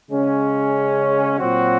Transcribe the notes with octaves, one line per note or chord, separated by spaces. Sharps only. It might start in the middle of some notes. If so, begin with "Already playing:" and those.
C#3 G#3 C#4
A#2 F#3 C4 F#4